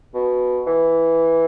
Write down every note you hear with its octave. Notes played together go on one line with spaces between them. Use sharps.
B2
E3